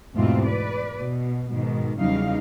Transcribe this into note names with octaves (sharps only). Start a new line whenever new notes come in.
E2 G#2 B2 A3 C4 F4
B4 D5
B2
G#2 B2 D#3
E2 C#3 F#3 G3 D#4 F5